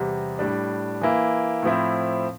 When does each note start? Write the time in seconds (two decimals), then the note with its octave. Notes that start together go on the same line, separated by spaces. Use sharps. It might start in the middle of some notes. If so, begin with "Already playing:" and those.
Already playing: E2 C3 G3
0.39 A2 G3 D4
1.01 E3 A#3 E4
1.63 A2 F3 C4 E4